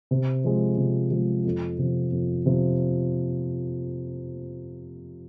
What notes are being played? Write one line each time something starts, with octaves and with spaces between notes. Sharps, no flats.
C3
F3 G#3
C3
F3 G#3
F2
C3 F3
F2
C3 F3